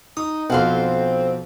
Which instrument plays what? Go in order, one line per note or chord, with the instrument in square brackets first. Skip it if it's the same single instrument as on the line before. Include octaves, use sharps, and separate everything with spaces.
[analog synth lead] D#4 [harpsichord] D#6
[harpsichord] B1 F2 [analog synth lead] C4 [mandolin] F#4 F5 C6